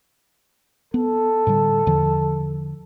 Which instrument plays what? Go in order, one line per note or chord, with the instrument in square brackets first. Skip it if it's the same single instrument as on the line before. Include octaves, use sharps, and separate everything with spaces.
[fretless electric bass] B3 [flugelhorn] A4
[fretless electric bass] A2 D3 G3
E2 D3 F3